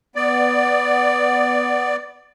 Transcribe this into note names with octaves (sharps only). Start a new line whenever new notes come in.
B3 D5